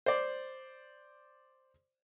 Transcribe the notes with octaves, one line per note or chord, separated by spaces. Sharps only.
C5 D5